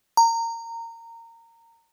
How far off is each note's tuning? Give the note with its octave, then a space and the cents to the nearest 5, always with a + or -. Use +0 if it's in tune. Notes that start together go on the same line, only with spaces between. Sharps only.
A#5 -20